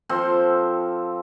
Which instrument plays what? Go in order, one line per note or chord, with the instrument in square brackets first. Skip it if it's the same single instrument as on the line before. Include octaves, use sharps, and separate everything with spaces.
[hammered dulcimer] F3 C4 A4